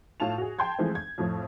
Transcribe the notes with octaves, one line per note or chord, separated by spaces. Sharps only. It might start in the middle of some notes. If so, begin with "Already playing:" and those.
A2 F4 A5 F7
F#4 G#4
G5 A5 C6 G6 G#6
E3 F3 G#3 A3 C4
G#6
F2 A2 F3